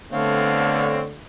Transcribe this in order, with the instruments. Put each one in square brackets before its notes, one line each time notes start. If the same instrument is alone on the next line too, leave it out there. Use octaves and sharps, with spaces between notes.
[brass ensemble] D3 A3 [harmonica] B3 C4 C#5 [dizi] F5